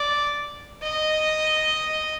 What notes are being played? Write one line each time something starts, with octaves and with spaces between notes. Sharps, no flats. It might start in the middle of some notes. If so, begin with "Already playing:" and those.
Already playing: D5
D#5